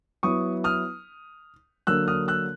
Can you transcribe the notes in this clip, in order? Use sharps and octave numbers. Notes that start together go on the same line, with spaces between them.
F#3 B3 E4 C#6 D#6
D#6 F6
D3 F#3 A#3 E6 F#6
D#6 F6
E6 F#6